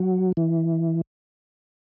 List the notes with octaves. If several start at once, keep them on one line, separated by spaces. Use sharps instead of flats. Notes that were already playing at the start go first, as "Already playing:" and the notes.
Already playing: F#3
E3